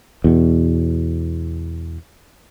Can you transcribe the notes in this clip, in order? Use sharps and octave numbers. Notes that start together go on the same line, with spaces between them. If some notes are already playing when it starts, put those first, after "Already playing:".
E2 B2